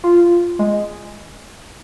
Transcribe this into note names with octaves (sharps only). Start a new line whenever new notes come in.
F4
G#3